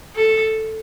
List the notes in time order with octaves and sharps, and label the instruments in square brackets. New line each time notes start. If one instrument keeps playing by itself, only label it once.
[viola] A4